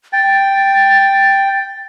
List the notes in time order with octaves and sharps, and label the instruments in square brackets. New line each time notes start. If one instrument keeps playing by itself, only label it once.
[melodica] G5 [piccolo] A6